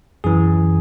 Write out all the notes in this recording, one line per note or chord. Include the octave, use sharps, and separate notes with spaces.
F#2 E3 G#4